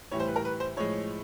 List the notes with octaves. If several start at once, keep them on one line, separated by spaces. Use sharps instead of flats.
A2 E3 G3 C#5
C5
B4
A#4
B4
C5
A2 F3 G#3 C#5